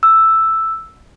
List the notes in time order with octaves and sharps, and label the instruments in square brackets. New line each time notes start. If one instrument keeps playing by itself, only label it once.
[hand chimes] E6